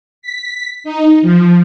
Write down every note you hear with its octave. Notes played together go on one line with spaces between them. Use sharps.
B6
D#4
F3